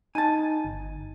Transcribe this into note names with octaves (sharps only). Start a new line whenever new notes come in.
D#4 G#5 A5
G1